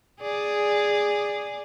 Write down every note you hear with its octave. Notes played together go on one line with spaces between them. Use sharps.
G#4 D5